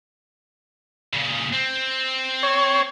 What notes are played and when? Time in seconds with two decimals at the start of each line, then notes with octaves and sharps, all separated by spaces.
1.13 A#2 C#3
1.53 C4
2.43 C#5